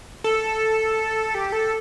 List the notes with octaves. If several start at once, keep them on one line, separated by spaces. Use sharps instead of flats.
A4
G4
A4